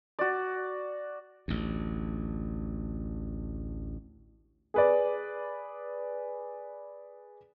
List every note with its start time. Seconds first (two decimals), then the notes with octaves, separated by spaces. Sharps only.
0.19 F#4 D5
1.48 A1 D2
4.74 G#4 B4 D5